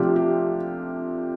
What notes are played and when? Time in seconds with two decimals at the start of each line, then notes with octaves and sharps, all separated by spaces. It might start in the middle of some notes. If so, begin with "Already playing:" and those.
Already playing: C3 F3 A3 D4 F4 G4
0.16 G4